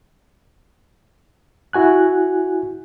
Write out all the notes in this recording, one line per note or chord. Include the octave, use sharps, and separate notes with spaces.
E4 F#4 G#5 F#6